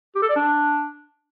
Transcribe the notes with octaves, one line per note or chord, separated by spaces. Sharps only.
G4
A4
D5
D4